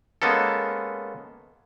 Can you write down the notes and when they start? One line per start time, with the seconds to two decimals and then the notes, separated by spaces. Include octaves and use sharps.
0.22 G#3 A#3 B3 C#4 A4